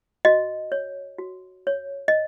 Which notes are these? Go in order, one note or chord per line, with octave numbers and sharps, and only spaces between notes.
F#4 D#5
C#5
F#4
C#5
D#5